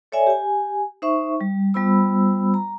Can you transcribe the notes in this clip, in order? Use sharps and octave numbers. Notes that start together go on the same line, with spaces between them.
A4 C#5 D5 E5 G#5
G4 G#5
D#4 C5 E5 C#6
G3
G3 B3 F4 C5 B5 E6
A#5